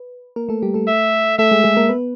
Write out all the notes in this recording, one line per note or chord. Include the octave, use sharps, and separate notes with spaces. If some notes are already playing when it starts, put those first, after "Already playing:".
Already playing: B4
A#3 A#4
A3 A4
G3 G4
A3 A4
E5
A3 A4 E5
G#3 G#4
G#3 G#4
A#3 A#4
B3 B4